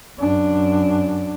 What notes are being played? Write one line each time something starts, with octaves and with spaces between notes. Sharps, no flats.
F#2 D4